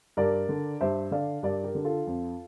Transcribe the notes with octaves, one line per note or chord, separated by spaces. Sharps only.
G2 A#4 D5
D3
G2 C5 E5
D3 D5 F5
G2 A#4 D5
G4 A#4
D3
F4 A4
F2